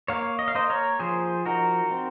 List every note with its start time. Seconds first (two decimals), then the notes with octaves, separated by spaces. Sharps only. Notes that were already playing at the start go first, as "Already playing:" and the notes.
0.08 A#3 C#5 F5
0.39 D#5
0.48 F5
0.55 A#3 C5 D#5
0.70 A#4 C#5
0.99 F3 G#4 C5
1.46 D#4 F#4 A#4
1.91 C4